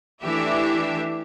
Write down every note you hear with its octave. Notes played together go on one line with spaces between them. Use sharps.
E3 A3 D4 G4 E5